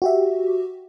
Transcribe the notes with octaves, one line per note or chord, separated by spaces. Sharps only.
F#4 G4 E5